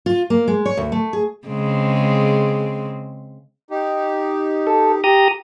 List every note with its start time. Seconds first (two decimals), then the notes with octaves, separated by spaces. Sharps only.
0.06 F4
0.30 A#3
0.48 G#3
0.65 C#5
0.77 D2
0.92 A3
1.13 G#4
1.48 C#3 G#3 C4
3.71 D#4 G4
4.67 A4
5.04 G4 A#5 D#6